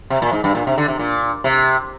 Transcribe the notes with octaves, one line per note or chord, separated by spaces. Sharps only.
C3
A#2
G#2
G2
A#2
C3
D3
C3
A#2
C3